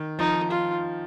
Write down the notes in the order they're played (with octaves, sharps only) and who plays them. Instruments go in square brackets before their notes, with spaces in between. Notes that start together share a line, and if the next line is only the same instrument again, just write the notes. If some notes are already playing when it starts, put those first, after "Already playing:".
Already playing: [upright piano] D#3
[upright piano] F3 [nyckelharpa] D#4
[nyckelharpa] F4